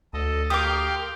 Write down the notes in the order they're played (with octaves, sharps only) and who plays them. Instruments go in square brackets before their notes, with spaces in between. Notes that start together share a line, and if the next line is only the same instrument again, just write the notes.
[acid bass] D2 [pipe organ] A4 D#5
[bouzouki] G4 A#4 [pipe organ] F5 G5 C6 [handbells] D6 D#6